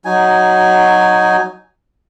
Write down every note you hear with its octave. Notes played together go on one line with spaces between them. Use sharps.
F#3 D#4 G#5